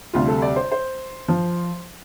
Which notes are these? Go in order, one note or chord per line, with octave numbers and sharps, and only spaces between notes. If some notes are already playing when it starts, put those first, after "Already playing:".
D2 C3 G3 F4
A4
D5
C5
C5
F3